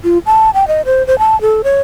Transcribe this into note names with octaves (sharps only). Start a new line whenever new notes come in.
F4
A5
G5
D#5
C5
C5
A5
A4
C#5